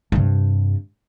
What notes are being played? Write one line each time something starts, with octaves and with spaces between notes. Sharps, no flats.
G2 C3